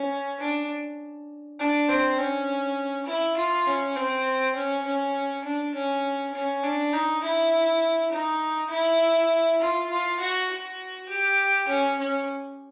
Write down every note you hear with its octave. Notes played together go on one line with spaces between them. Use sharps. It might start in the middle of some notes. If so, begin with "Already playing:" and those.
Already playing: C#4
D4
D4
C4
C#4
E4
F4
C#4
C4
C#4
C#4
D4
C#4
C#4
D4
D#4
E4
D#4
E4
F4
F4
F#4
F#4
G4
C#4
C#4